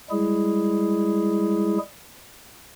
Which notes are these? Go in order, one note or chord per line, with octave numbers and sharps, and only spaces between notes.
G3 G#3 E4 G#4